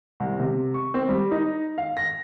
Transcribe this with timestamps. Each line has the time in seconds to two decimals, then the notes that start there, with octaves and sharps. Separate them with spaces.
0.20 C2
0.40 C3
0.74 C#6
0.94 C4
1.08 G3
1.31 D#4
1.78 F5
1.97 A#6